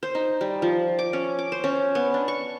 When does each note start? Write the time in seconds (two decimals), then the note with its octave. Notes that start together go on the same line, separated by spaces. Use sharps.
0.03 C5
0.15 D#4
0.41 G3
0.62 F3
0.99 D6
1.13 C#4
1.39 D6
1.52 C5
1.64 C#4
1.95 B3
2.14 D4
2.28 C#6